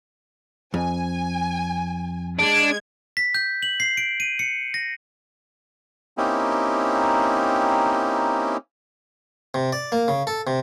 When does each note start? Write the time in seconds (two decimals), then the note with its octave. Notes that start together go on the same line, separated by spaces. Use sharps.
0.74 F2 G#5
2.39 G#3 D4 G#6
3.17 B6
3.34 G6
3.63 F#7
3.80 C7
3.97 D7
4.20 D#7
4.39 C#7
4.74 A#6
6.18 A#3 C4 C#4 D#4 E4 G4
9.54 C3
9.73 D5
9.92 A#3
10.08 C#3
10.27 A4
10.47 C3